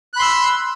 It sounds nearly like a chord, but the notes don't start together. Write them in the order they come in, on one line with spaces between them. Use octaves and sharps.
F#6 B5 C6 E6